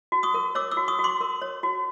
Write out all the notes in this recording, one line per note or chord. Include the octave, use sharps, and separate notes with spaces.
F#4
C#6 D#6
A#4
C#5 D6 E6
D6 E6
F#4
C#6 D#6
F#4
C6 D6
A#4
C#5
F#4